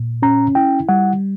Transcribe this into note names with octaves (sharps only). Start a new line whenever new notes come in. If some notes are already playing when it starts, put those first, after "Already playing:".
Already playing: A#2
C#4 A#5
E4 G5
G3 F#5